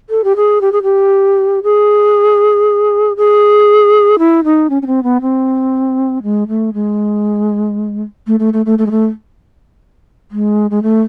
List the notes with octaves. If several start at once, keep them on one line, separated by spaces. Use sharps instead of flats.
A4
G4
G#4
G4
G#4
G4
G#4
G#4
E4
D#4
C#4
C#4
C4
B3
C4
G#3
A3
G#3
A3
A3
A3
A3
A3
G#3
A3
G#3
G#3
A3